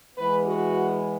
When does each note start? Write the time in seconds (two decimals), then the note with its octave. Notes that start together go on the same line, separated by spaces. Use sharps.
0.15 E2 E3 G#3 B3 B4
0.45 F#4